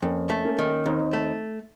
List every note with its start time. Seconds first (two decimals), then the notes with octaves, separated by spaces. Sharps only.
0.02 F2 A#3 C#4
0.30 A3
0.45 A#3 C#4
0.59 D#3
0.86 D#2 C4 D#4
1.13 A3